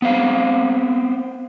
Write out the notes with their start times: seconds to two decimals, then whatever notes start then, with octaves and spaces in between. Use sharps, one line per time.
0.02 B3 C4 F5